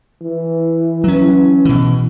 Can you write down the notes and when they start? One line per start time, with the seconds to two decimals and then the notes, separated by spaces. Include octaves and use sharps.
0.22 E3
1.04 F#3 C#4
1.65 B2 E3